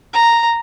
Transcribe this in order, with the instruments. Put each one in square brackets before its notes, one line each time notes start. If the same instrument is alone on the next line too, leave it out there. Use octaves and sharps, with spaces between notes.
[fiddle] A#5